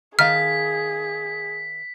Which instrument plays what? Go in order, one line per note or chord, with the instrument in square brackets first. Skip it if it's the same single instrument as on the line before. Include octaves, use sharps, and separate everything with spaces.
[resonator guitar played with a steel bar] D#3 F5 [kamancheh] G#4 [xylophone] F6 [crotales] B6